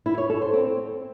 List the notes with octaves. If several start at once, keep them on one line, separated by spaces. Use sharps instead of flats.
E4
C#5
A4
C5
C4